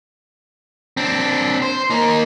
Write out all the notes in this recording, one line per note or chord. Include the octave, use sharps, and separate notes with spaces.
C4 D4
C5
A#3 D#4